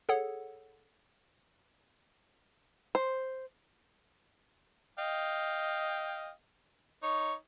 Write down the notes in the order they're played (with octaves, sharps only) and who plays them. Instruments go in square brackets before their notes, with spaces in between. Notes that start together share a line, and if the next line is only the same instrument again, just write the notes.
[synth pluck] G#4 A4 C#5 F#5
[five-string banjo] C5
[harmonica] D#5 F5 G5
D#4 C#5 C#6